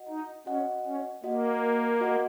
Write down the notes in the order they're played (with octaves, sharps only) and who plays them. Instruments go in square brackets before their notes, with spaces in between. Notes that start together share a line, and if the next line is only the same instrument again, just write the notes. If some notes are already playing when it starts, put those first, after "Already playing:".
Already playing: [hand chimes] F#4 D#5 F#5
[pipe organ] D#4
[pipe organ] C#4 [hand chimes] F#4 D#5 F#5
[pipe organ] C#4
[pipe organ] A#3 [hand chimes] F#4 D#5 F#5
[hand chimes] F#4 D#5 F#5